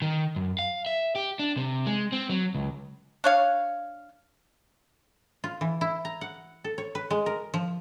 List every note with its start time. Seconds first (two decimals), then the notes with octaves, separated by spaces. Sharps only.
0.02 D#3
0.36 F#2
0.59 F5
0.86 E5
1.16 G4
1.39 D4
1.57 C3
1.86 G#3
2.12 C4
2.29 F#3
2.55 C#2
3.24 D4 C#5 F5
5.44 F4
5.61 E3
5.81 E4
6.05 A#5
6.21 F#5
6.64 A4
6.78 C#5
6.95 B4
7.11 G#3
7.26 A#4
7.54 F3